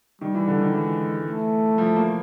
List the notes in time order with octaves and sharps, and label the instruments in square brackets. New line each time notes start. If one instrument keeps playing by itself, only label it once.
[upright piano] D#3 [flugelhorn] G3
[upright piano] E3
D3
D#3
[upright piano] E3 [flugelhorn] G#3
[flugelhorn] A3
[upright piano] F3
A#3